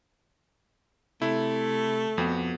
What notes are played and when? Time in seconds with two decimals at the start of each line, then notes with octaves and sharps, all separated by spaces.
1.22 C3 A3 E4
2.18 F2 F3 B3 F#4